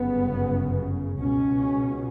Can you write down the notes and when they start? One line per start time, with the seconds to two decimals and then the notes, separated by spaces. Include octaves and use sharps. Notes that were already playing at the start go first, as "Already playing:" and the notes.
Already playing: G1 F#2 C#3 B3
1.19 C#2 B2 C#4